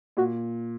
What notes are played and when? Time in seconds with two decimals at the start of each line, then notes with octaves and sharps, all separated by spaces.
0.17 A#2 F#4